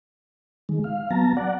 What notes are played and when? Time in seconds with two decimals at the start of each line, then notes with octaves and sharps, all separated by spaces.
0.69 D#3 G#3
0.84 F5
1.11 F#3 B3 A5 A#5
1.37 D5 F#5